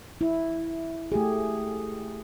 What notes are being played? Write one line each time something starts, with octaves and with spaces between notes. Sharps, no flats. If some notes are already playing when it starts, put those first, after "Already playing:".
E4
A3 G4 G#4